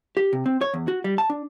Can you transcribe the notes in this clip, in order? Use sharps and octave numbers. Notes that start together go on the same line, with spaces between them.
G4
C3
C4
C#5
E2
F#4
G3
A5
D4